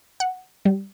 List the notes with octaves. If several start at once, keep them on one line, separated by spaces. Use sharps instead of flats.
F#5
G3